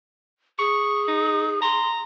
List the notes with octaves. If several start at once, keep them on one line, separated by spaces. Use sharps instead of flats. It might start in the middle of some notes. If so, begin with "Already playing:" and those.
G#4 C#6
D#4
A#5 C6